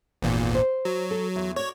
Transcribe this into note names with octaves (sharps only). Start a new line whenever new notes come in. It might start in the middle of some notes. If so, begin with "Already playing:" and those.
G#1 E2 A#2
C5
F#3
A4
E2
F#4 C#5 D5